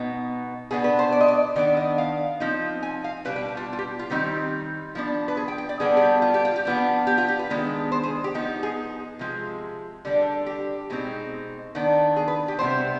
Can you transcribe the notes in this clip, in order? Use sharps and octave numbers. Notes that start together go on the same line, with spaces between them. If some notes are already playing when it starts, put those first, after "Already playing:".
Already playing: B2 B3 D#4
B2 B3 D4 G#4
B4
C5
D5
D#5
D5
D#3 B3 D4 D5
D#5
F5
F3 C4 D#4
G#5
F5
B2 G3 D4 B4
B4
F4
F4
G4
F4
D#3 G3 C4 D#4 G4
F3 B3 D4
B4
G#4
G5
G5
D5
D3 G3 B3 D4 G#4
G#4
G4
F4
G4
F4
G4
F3 B3 D4 F4
G4
F4
G4
B4
D#3 G#3 B3 D4
C5
G#4
G4
F3 B3 D#4
G#4
C3 F3 G#3
D3 G3 D4
G4
B2 G#3 C4 D#4
D#3 B3 D4
G#4
B4
G4
C3 G3 B3 C5